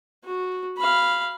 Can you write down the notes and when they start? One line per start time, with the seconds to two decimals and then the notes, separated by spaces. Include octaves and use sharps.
0.24 F#4
0.78 F5 B5